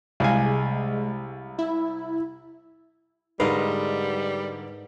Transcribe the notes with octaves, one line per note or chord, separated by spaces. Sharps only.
C2 G#3 F5 G#5
E4
G#2 D3 G3 A#4 B4 D#5 F5